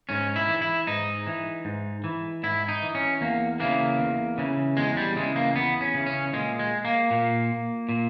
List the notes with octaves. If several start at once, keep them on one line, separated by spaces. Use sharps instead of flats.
G#2 C#4
E4
E3
E4
G#2 D#4
E3
G#2
E3
G#2 E4
D#4
E3
C#4
E2 A#3
C#3 E3 A#3
E2
C#3 E3
E2 G#3
G3
C#3 E3 G#3
A#3
E2 B3
C#4
C#3 E3
C#4
A#2 G#3
G#3
A#3
A#2
A#2